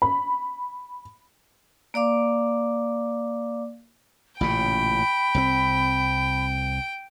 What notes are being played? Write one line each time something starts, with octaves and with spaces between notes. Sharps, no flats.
B5
A#3 D5 F5 D6
A1 A#2 C#3 G5 B5
C2 F3 C4